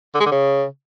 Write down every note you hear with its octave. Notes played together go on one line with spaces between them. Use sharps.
D3
G#3
D3
C#3